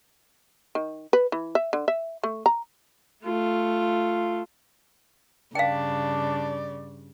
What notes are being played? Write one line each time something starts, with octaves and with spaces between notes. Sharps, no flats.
D#3
B4
E3
E5
D3
E5
A3
A#5
A3 F4
G2 C#3 D4 D5 F5 G5